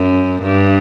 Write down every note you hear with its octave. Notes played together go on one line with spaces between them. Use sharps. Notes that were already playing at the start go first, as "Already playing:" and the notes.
Already playing: F#2
G2